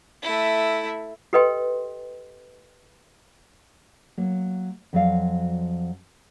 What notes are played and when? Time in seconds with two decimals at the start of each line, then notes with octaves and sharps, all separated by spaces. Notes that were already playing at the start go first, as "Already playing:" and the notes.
0.22 A3 E4
1.33 G4 A4 B4 D#5 G5 C6
4.17 F#3 A#3
4.93 F2 F3 F#3 F#4 D5 F5